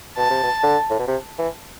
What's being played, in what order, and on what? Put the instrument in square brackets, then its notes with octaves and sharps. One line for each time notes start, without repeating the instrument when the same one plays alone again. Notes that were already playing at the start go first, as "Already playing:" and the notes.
[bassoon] B2 [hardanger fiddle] A5
[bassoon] C3
B2
D3
A2
B2
C3
E3